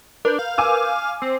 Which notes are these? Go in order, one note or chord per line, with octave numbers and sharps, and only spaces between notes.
D4 A#4 B4 G6
F5
G#5 D6 E6
C4